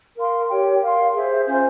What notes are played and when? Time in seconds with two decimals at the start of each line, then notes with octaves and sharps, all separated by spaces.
0.16 A#4 F5 C6
0.48 G4 A#4 C#5 G5
0.81 A#4 F5 C6
1.14 G#4 C5 E5
1.46 C#4 F4 C5